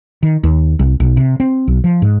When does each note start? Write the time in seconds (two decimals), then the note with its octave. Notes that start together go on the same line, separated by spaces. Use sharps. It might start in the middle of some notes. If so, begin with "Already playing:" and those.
0.23 D#3
0.44 D#2
0.79 C2
1.00 B1
1.17 C3
1.40 C4
1.68 B1
1.84 F3
2.02 G#2